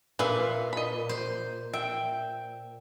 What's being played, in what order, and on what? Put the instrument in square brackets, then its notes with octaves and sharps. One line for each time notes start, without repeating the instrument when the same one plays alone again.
[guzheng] A#2 [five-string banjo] B4 E5 F5
[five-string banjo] D#5 B5
[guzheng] C5
[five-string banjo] E5 [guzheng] G5